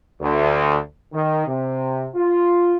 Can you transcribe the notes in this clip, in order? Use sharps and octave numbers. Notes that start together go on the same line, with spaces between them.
D2
D#3
C3
F4